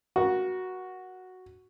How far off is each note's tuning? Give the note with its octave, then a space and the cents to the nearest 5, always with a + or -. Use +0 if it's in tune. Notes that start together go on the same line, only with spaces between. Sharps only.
F#4 +0 A#4 +35